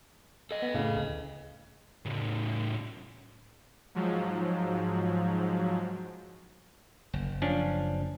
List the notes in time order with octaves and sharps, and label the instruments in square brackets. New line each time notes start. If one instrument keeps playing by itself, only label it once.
[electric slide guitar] A4 D#5
[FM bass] B3
[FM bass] A2 [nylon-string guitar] C#3
[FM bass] D2
[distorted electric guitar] A2 C#3
[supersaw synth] G#2 F3 F#3
[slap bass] F#1
[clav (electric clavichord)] F3 C#4 D4